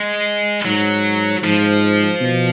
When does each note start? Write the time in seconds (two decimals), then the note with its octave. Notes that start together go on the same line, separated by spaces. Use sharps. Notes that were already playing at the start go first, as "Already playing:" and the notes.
Already playing: G#3
0.65 G#2 F#3
1.43 G#2 F3
2.21 B2